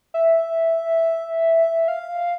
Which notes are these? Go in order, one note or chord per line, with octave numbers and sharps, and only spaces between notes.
E5
F5